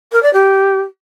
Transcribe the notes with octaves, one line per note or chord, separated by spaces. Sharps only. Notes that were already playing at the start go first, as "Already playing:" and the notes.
A#4
D5
G4